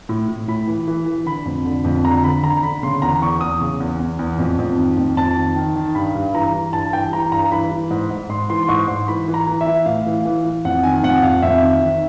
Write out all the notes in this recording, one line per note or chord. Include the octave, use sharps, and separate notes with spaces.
A2
A2
A2 B5
E3
E3
E3
D3 B5
F2
D3
F2
D3 A#5
D3 B5
D3 A#5
D3 B5
C#3 C6
E2 A#5
E2 C#6
E2 D#6
C#3
E2
E2
E2
F2
F2
D#3
F2
F2 A5
D#3
D#3
D#3
G2 B5
G2
E3 A#5
E3
G2 A5
E3 G5
E3 A#5
G2 A#5
E3 B5
E3
G#2
G#2
G#2 C6
E3 C6
C6
G#2 C#6
G#2 C6
E3 B5
E3
A#5
E3
E5
E3
A2 F5
E3
E3
E3
F2 F#5
D#3 G#5
F2 F#5
F2 F5
F2 E5
D#3
D#3